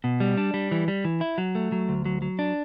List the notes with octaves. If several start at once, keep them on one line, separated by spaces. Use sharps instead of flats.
B2
G3
D4
G3
E3
G3
E3
E4
F#3
A3
F#3
D2
F#3
F#3
D4